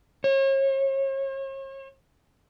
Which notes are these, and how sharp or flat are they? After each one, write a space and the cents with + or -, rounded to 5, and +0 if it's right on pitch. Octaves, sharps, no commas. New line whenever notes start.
C#5 -40